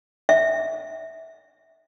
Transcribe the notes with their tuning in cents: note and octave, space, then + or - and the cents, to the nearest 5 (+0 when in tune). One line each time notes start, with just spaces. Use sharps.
E5 -20